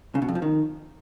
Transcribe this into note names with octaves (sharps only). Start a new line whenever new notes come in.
C#3
B2
F2
F3
D#3